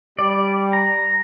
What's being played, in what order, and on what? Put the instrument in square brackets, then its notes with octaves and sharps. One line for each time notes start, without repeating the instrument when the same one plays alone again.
[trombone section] G3 [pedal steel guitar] D5
[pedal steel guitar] A#5